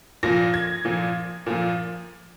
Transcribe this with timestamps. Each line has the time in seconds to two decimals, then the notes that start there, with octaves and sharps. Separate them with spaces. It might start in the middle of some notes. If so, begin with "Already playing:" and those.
0.23 A#2 F3 A#6
0.54 G#6
0.85 A#2 F3
1.46 A#2 F3